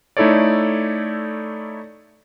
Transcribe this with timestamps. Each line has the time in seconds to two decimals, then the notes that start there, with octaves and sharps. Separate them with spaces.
0.17 A3 D#4 E4 A4 C#5 D5